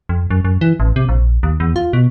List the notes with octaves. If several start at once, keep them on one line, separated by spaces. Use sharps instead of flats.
F2
F#2
F#2
E3
A1
C3
A#1
D#2
E2
F4
B2